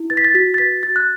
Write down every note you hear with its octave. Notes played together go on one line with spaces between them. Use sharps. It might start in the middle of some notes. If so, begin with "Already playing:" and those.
Already playing: E4
B4 A6
B6
A6
F#4 B6
A6
B4 B6
F#4 A6
F#6